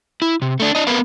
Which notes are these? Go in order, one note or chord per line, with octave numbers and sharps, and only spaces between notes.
E4
C3
A3 D4
D4 D#5
B3 A#4 B4 E5 F5